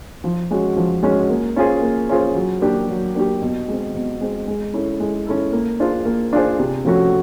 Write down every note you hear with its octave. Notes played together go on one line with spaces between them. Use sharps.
F3
G#3 C#4 F#4
F3
G#3 C#4 F#4
A#3
C#4 F4 G#4 C5
A#3
C#4 F4 G#4 C5
F#3
A#3 D4 G4
F#3
A#3 D4 G4
B2
G#3 C4
B2
G#3 C4
G#3
C#4 E4 A4
G#3
C#4 E4 A4
A#3
D4 F4 G#4 C5
A#3
D4 F4 G#4 C5
C3
F3 A3 C#4 F#4